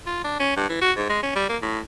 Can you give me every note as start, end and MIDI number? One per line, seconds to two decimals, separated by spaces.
0.06 0.21 65
0.24 0.38 62
0.40 0.52 61
0.56 0.68 43
0.69 0.81 52
0.81 0.92 66
0.97 1.09 44
1.09 1.21 56
1.23 1.32 61
1.35 1.48 55
1.49 1.57 58
1.62 1.79 45